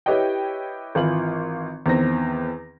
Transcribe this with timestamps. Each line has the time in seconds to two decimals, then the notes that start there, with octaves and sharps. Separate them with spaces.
0.06 E4 G4 B4 C#5 D#5 G5
0.95 G#1 E3 F4 F#7
1.86 E2 D#3 C4 A#6